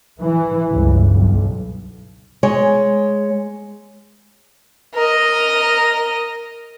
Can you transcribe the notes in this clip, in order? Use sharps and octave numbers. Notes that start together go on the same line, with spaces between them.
E3
G1 C#2
B1
G#3 C#5
A#4 D#5